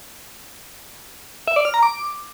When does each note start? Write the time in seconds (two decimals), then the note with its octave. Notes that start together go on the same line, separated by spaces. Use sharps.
1.48 E5
1.56 D5
1.65 F6
1.74 A#5
1.83 D6